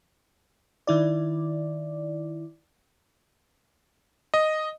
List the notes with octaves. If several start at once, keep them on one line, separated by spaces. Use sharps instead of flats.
D#3 E4 D5
D#5